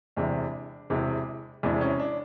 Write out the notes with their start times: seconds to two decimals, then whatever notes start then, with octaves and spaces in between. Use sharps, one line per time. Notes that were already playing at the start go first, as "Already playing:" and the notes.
0.17 E1 E2 C3 E3 D4
0.90 E1 E2 C3 E3
1.63 E1 E2 C3 E3 D4
1.81 C#4
2.00 D4